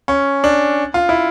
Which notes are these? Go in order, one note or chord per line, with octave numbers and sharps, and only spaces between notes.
C#4
D4
F4
E4